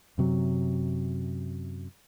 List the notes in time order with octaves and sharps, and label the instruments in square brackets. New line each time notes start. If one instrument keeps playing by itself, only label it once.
[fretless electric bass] F#2 C3 F#3